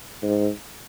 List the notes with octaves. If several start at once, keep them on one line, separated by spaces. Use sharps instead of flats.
G#2